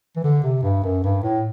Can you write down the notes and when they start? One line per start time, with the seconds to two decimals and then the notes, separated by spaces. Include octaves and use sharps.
0.16 E3
0.24 D3
0.43 C3
0.63 G2
0.83 F#2
1.04 G2
1.23 A2